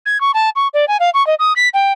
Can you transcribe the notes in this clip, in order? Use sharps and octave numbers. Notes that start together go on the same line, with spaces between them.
G#6
C#6
A5
C#6
D5
G#5
F5
C#6
D#5
D#6
B6
G5